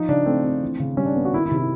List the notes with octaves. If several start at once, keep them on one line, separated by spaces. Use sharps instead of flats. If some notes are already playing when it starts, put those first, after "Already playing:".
Already playing: F3 D#4
C#3 D4
A3 C4
C4
E3
C#3
G3 C#4
D4
B3
F#4
D#3 E4
E4
C3
E4